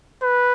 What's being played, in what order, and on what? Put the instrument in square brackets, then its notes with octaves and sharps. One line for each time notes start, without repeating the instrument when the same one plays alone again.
[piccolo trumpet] B4